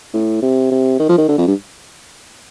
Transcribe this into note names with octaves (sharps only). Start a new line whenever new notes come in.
A2
C3
C3
D#3
F3
D#3
D3
F2
G2